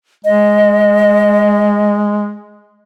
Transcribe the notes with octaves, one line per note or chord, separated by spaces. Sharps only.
G#3 D#5